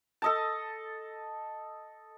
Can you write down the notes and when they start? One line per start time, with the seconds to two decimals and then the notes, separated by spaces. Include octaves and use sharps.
0.22 A4 D#5 A5